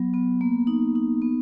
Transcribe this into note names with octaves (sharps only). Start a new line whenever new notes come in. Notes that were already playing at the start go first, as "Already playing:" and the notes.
Already playing: F#3 B3
B3
A#3
D#4
D#4
B3